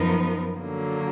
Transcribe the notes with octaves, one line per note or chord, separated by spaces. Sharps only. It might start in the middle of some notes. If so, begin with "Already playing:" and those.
Already playing: F#2 F3 B3 D#4 A#4
D3 F#3 A#3